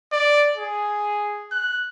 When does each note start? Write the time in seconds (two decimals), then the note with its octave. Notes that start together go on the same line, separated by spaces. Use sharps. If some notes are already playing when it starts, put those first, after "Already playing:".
0.12 D5
0.56 G#4
1.52 F#6